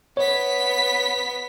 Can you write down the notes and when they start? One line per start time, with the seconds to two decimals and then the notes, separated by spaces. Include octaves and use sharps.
0.17 B3 C#5 B6